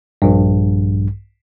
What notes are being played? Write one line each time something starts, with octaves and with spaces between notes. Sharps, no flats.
A#1 G2